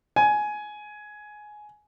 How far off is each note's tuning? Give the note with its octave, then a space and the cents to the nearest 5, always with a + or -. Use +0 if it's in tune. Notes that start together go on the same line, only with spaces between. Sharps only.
G#5 +15